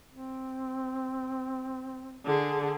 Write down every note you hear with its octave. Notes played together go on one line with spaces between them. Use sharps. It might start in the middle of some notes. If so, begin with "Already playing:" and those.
C4
D3 G#4